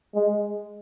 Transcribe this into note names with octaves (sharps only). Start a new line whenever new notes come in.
G#3